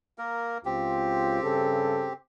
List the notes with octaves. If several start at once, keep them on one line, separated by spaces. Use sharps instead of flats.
A#3 A#4
C#2 C4 F4 G4
G2 C#3 A4